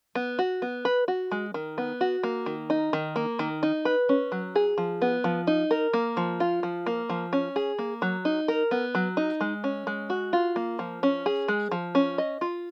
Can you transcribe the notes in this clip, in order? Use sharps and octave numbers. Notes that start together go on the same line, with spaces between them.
B3
F#4
B3
B4
F#4
G#3
D#3
B3
F#4
A#3
D#3
D#4
D#3
A#3
D#3
D#4
B4
C#4
F#3
G#4
F3
B3
F3
D#4
A#4
A#3
F3
F4
F3
A#3
F3
C#4
G#4
A#3
F#3
D#4
A#4
B3
F#3
D#4
G#3
C#4
G#3
F#4
F4
A#3
F3
C#4
G#4
G#3
F3
C#4
D#5
F4